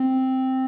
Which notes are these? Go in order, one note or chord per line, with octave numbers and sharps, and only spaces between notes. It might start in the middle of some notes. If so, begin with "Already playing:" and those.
Already playing: C4